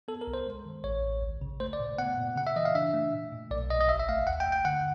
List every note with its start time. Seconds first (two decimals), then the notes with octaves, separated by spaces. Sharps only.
0.08 B3 A4
0.21 A#4
0.27 C2
0.34 C5
0.46 G#3
0.65 D#3
0.84 A1 C#5
1.03 A1
1.22 C#2
1.41 C#3
1.60 A3 C5
1.73 D5
1.80 A#2
1.98 B3 F#5
2.18 A#2
2.36 C#3 F#5
2.47 E5
2.56 E3 D#5
2.65 F5
2.75 D4 E5
2.94 A3
3.13 A#2
3.32 A#2
3.51 B1 D5
3.70 B1 D#5
3.80 D#5
3.89 G#1 E5
4.00 E5
4.09 A3 F5
4.27 D#2 F#5
4.40 G5
4.46 D#2
4.52 G5
4.65 D3 F#5